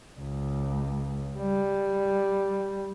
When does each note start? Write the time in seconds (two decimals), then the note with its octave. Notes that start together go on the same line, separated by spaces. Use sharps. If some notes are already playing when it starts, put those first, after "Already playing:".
0.19 C#2
1.37 G3